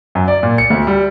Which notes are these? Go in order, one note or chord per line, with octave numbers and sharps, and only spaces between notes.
F#2
D5
A#2
C#7
D2
G3